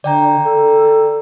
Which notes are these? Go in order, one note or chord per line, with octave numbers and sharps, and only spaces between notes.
D3 D5 G5 A#5
A4